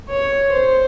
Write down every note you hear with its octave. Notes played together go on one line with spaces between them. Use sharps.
C#5
C5